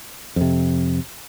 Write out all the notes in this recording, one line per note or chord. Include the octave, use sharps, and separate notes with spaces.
F2 C3